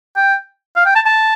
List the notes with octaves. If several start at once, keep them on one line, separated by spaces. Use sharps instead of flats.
G5
F5
G5
A5
A5